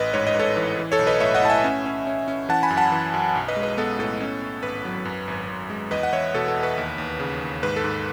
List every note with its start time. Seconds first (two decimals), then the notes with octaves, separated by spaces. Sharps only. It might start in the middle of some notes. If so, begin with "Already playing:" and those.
Already playing: A1 B4 D#5
0.14 G#2 C#5
0.27 D#5
0.35 G#2 A4 C#5
0.57 E3
0.79 E3
0.92 A4 C#5
0.99 B1
1.07 B4 D#5
1.20 A2 C#5 E5
1.35 D#5 F#5
1.42 A2 A5
1.50 E5 G#5
1.64 C#4
1.86 C#4
2.07 C#4
2.28 C#4
2.49 E3 F#5 A5
2.63 G#5 B5
2.71 F#2
2.77 F#5 A5
2.92 E3
3.14 F#2
3.35 B1
3.48 B4 D#5
3.56 G#3
3.63 B4
3.77 B3 A4
3.99 A2 A4
4.20 C#4
4.42 C#4
4.63 G#1 B4
4.85 F#3
5.05 F#2
5.28 G#1
5.49 G#1
5.70 G#3
5.91 E2 B4 D#5
6.03 F#5
6.12 E2 C#5 E5
6.34 B2 A4
6.48 A4
6.56 E2
6.63 B4
6.78 D#2
6.98 D#2
7.20 C#3
7.41 D#2
7.63 G#2 B4
7.76 A4
7.84 G#2